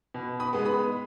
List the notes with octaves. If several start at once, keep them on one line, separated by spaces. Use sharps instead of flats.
B2
B5 D#6
G#3 B3
B5 D#6